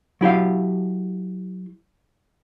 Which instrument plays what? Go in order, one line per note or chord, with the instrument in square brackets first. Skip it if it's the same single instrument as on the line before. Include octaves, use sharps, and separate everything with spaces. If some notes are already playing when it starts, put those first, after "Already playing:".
[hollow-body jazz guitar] F#3 E4 G4 F5